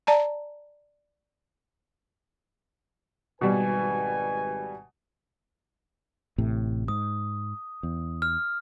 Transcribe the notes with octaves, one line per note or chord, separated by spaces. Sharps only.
D5 A5 A#5
G#1 B2 G3 B4 G#5
A1 A2 C3
G#2 D#6
E2
F6